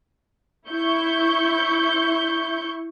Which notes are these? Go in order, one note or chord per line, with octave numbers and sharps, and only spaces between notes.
E4 C#6 G6